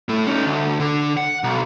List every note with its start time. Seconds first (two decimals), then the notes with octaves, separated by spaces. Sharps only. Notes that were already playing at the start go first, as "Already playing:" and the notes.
0.09 A2 A3
0.27 C#4 D#4
0.46 D2
0.80 D3
1.17 F#5
1.44 B1